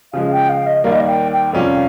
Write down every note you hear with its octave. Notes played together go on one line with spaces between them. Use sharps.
C#3 F3 G#3 F5
G5
F5
D#5
D#2 D#3 G3 A#3 F5
D#5
F5
G5
G5
F2 C3 G3 C#4 F4 F5